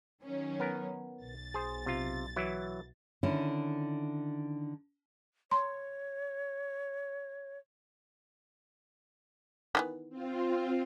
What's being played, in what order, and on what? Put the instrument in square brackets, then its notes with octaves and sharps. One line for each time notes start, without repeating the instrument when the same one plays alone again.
[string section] D#3 F#3 C#4
[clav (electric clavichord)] B3 A#4
[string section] B1 A6
[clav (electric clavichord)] G#4 C5
C3 F4
E3 F#3 E4
[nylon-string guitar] D3 D#3 C#4 E4
[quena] C#5 [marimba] A#5 C6
[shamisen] D#3 E3 B3
[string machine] C4 F4